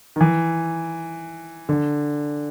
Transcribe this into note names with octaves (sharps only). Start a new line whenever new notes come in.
D#3
E3
D3